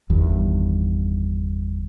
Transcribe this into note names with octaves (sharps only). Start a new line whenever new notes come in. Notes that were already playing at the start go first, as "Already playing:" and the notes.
G1 E2 G2 D#3